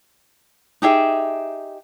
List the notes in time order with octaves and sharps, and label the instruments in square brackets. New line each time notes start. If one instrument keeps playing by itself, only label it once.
[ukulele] D#4 G4 G#4 E5